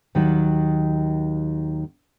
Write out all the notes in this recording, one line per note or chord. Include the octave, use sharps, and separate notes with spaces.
D#2 D#3 F#3